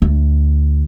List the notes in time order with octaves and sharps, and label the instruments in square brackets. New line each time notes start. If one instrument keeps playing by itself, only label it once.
[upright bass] D2